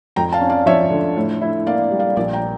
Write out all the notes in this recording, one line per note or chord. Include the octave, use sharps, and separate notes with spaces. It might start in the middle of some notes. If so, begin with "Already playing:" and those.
F2 G5 A#5
F5 A5
C#4
D5 F5
F3 C#5 E5
D3
A2
E4
A#3 D5 F5
G3
D5 F5
A#1 A#4 D5
G5 A#5